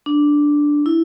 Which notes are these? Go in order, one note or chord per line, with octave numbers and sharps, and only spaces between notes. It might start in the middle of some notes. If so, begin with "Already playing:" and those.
D4
E4